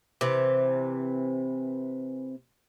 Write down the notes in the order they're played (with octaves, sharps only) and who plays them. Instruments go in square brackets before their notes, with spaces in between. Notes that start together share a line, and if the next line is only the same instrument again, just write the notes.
[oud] C3 E3